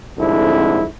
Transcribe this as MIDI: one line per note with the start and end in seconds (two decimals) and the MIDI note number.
0.18 0.85 36
0.18 0.85 41
0.18 0.85 44
0.18 0.85 50
0.18 0.85 64